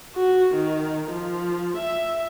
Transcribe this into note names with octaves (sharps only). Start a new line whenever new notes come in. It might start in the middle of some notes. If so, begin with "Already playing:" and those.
F#4
D#3
F3
E5